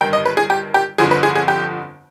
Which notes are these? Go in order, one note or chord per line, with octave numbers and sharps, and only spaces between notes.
G1 G2 D#3 G5
D#5
B4
G#4
G4
G4
G1 F2 D3 F3 G#4
B4
G#4
G#4
G4